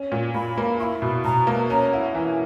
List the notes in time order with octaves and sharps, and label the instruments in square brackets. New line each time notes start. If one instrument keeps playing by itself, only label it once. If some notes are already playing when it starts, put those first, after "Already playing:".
Already playing: [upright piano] C#4
A#2
[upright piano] A#2 [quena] B5
[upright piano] A#3
[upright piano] E4 [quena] B5 C#6
[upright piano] B2
[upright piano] B2 [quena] A#5
[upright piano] A#3
[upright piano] C#4 [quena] A#5
[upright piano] E4 [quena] F#5
[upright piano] E3 [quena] G#5